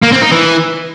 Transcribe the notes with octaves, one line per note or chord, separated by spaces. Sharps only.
A#3
C4
D#4
E3